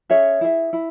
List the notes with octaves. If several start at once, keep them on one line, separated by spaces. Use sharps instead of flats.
C#4 G#4 C#5 E5
E4 G#4 E5
E4